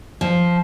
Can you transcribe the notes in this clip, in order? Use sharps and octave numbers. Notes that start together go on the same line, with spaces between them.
F3